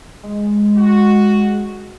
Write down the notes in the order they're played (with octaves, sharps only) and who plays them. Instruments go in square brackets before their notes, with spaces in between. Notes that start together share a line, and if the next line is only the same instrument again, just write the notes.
[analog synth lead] G#3
[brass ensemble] F#4